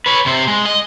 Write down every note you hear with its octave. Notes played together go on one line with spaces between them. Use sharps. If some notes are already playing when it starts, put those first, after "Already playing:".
B4 C#5
C3 C5
G#3
D#5